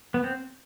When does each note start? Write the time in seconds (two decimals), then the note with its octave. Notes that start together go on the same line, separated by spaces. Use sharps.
0.14 B3
0.24 C4